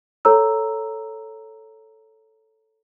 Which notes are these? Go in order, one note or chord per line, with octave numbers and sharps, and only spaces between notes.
A4 C#5 A#5 E6